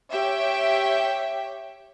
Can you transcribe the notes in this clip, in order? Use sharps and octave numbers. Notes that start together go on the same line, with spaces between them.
G4 C#5 E5 G5